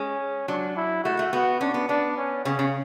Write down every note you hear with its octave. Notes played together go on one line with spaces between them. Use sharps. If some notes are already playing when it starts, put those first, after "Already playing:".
Already playing: G#3 C#4
F#3 D4
E4
A3 F#4
A3
B3 F#4
C#4 D4
B3
B3 D4
C#4
C#3 C#4
C#3